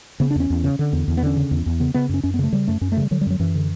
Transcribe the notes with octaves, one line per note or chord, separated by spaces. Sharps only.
C#3 B3
D4
E2 C#4
E2
C#3
D3
E2
E2
B3
D3 C#4
C#3
E2
E2
C#3 B3
C#3 B3
F#2 C#4
F#2 C#4
B3
C#3 A3
C#3 G3
F#2 A3
F#2 C#4
A3
C#3 G3
D3 F#3
G3
F#2
F#3
F#2 E3
D3